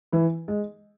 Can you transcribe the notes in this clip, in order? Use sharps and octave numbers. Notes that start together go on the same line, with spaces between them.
E3 E4
G#3